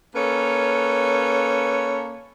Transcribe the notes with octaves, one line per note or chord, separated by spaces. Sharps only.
A#3 C#4 A4 B4 C#5